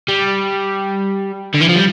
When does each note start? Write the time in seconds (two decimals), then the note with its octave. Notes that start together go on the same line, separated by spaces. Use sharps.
0.09 G3
1.54 D3
1.61 E3
1.69 F3
1.76 G3